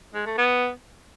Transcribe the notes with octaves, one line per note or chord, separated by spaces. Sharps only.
G#3
A3
B3